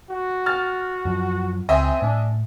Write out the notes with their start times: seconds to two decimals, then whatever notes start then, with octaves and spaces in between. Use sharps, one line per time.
0.10 F#4
0.46 F6 A6
1.05 F#2 F3
1.69 C#2 C4 D#5 E5 G#5
2.02 A2 D4